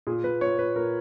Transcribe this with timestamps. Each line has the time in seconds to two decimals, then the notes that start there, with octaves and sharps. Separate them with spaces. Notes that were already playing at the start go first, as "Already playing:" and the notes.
0.07 A#2 G#4
0.24 A#2 B4
0.41 A#2 C#5
0.58 A#2 B4
0.76 A#2 A#4